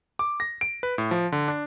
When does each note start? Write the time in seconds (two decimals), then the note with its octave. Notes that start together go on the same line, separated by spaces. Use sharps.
0.19 D6
0.40 A#6
0.61 D7
0.83 B4
0.98 A2
1.11 F3
1.32 D3
1.48 D4